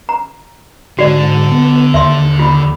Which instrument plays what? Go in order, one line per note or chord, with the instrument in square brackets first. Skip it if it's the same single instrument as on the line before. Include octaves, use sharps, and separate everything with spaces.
[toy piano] A#5
[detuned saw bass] G#2 [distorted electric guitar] D3 [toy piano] F#4 D5
[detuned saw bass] B3
[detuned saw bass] D#2 [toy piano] E5 C6
[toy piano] F4 B5